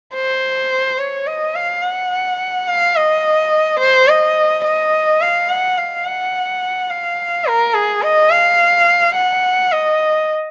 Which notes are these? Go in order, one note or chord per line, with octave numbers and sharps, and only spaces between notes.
C5
C#5
D#5
F5
F#5
F5
D#5
C5
D#5
D#5
F5
F#5
F5
F#5
F5
A#4
G#4
D#5
F5
F#5
D#5